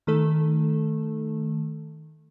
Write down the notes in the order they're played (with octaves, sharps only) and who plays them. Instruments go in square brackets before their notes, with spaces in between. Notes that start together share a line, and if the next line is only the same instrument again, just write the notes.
[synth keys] D#3 A3 A4